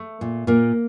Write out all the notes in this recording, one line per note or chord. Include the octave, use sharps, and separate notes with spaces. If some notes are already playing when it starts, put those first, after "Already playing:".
Already playing: A3
A#2
A#2 A#3